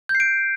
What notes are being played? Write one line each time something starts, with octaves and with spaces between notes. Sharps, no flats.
G6
C7
D7